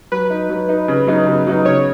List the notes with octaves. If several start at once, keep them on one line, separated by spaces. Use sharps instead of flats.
F#3 B4
D#4
F#3
D#4
C#3
F#3 B3 D#4
C#3
F#3 B3 D#4
C#3 C#5